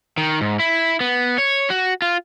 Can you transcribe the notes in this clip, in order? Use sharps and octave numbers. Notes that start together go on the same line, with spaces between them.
D#3
G#2
E4
B3
C#5
F#4
F4